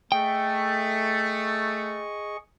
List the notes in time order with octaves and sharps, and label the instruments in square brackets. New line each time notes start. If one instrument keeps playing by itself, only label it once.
[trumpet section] A3 [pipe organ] G#4 D#5 C#6 [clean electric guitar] G5